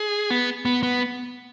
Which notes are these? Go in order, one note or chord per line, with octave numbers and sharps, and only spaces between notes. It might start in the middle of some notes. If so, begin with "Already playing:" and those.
Already playing: G#4
B3
B3
B3